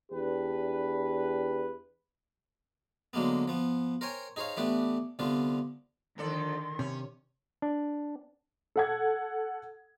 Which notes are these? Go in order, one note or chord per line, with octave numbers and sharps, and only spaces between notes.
E2 D4 G4 B4
D3 F#3 G#3 A#3 B3
F3 B3
A#4 C5 C#5 G5 G#5
D#4 G#4 C5 C#5 F5
E3 A3 B3 D4 G4
C2 D3 B3 F4
F2 D3 D#3 A4 D5 C6
C3 C#4
D4
A4 F#5 G#6